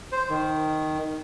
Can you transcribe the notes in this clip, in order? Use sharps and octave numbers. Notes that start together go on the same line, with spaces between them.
C5
D#3